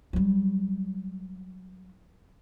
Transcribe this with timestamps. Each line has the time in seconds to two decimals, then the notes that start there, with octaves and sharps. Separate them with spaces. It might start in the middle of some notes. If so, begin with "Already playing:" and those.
0.13 F#3 G3